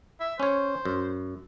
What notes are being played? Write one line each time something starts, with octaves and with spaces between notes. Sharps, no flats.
E5
C#4 C5 C#5
F#2